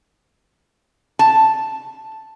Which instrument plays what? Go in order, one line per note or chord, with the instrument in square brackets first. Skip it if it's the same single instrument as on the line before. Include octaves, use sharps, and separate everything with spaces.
[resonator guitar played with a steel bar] A5